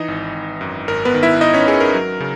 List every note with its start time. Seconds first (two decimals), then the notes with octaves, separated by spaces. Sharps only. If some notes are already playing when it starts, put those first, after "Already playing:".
Already playing: E3 D#4 D#5
0.08 G#1
0.35 G#1
0.61 F#2
0.88 G#1 A#4
1.05 B3 B4
1.14 D#3
1.23 E4 E5
1.41 G#1 D#4 D#5
1.54 C#4 C#5
1.68 G#1 G#4
1.80 A#4
1.94 F#3
2.20 C#3